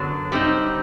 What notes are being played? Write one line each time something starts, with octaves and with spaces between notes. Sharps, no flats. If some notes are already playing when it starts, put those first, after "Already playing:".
Already playing: F#2 D3 F#3 B3 D4
G3 C4 D#4